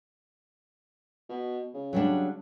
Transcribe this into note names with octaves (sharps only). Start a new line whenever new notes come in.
B2
C#3
F#3 G3 D4